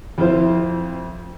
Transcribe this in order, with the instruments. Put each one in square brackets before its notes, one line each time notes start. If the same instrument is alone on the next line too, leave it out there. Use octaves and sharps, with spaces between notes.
[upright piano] F2 E4 F4 C5